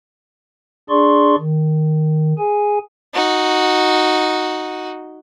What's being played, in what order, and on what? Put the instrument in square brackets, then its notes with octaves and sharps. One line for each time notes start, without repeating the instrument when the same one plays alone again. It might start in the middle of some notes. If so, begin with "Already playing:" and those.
[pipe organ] D4 G#4 D5 C6 C#6
D#3
G#4 G#5
[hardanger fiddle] D#4 F#4